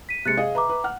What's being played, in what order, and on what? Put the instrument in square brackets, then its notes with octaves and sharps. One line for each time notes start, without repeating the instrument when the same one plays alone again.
[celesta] B6 D#7
[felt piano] C3 G#3 [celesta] F#6 A6 C#7
[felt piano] G#4 D#5 [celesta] F5
[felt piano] B4 [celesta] E5 A#5 D6
[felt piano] B4
F#5 F6